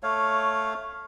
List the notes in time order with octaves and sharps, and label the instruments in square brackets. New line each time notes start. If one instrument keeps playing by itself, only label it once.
[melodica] A3 C#5 F5